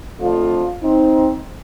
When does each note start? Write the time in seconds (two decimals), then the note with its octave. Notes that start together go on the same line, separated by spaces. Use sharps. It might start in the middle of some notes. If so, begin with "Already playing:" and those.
0.19 F2 D3 F3 A3 D4 F4
0.82 C4 D#4